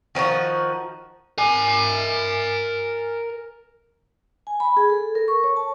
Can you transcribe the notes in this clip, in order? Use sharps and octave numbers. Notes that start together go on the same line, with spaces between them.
D#3 F3 D#4 F#4
A#4 G#5
G#5
B5
G#4
A4
A#4
C#6
C#5
A5